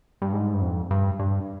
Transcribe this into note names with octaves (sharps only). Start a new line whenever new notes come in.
G2
G#2
G2
F2
G2
G2